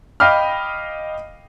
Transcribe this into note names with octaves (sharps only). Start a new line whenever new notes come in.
D#5 F5 G5 B5 D6 F6